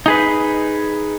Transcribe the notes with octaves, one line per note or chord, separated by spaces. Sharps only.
D#4 G#4 B4